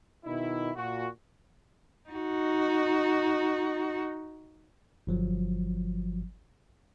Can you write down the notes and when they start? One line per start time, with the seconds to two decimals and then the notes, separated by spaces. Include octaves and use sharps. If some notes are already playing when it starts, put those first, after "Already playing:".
0.24 B2 D#3 D#4 E4
0.76 A#2 F#4
2.09 D#4 F#4
5.07 G1 F3 F#3